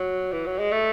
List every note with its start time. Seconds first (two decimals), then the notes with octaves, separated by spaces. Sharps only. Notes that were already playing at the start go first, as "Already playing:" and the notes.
Already playing: F#3
0.32 E3
0.46 F#3
0.59 G#3
0.72 A3